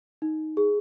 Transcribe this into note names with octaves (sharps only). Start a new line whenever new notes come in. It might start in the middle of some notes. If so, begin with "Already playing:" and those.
D#4
G#4